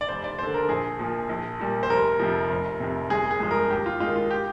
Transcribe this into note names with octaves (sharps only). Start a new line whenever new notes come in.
D5
F1 C5
D5
D#2 D3 C5
A#4
A#1 G#4
A#2 F3
A#1
A#2 G3
C5
F1 A#4
F2 C3 F3
F1
F2 C3
G1 G#4
G#4
G2 F3 G#3
A#4
D#2 G4
F4
D#3 G#3 F4
F4
G4